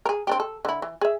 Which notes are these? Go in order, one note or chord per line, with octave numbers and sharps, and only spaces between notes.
G#4 A#4
C4 D4 G4
A4
D3 E4
E3
G#4 E5